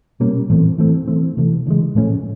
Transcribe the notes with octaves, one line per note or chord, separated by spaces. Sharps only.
B2 G3 A#3 C#4
A2 E3 A3 C4
E3 A3 C4
E3 A3 C4
C3 E3 A3
C#3 E3 G#3
A2 F3 A3 C#4